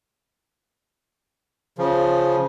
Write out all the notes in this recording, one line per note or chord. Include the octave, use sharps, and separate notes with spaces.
C#3 F3